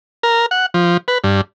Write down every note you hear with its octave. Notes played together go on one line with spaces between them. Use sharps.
A#4
F#5
F3
B4
G2